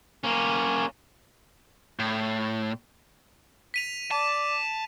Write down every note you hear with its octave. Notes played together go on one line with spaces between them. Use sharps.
A#3 C#4
A2
B6 D#7 F7
D5 A5